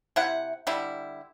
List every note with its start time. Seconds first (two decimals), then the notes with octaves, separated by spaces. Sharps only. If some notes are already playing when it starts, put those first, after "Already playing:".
0.16 C3 E4 F#5
0.67 D3 G3 E4